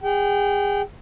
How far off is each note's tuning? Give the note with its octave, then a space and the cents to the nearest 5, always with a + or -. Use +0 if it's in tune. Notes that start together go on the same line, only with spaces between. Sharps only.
G#4 -35 G5 -25